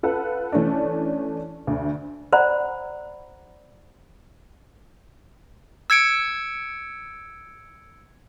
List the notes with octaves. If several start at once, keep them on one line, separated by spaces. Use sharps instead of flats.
F4 A4 B4 F#5
E3 A3 C#4 D4
D2 D3
C5 D5 F#5 A#5 B5
E6 G#6 C#7 D7